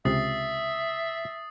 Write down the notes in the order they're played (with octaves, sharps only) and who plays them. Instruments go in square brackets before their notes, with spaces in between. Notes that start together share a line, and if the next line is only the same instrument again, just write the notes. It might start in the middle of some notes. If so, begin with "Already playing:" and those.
[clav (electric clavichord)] C#2 C3 [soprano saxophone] E5 [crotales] D#6 A6 C7